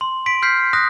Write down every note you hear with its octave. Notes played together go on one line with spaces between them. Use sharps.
C6
C6 B6 D7
F6 G6 B6 C7
D#6 F#6 A#6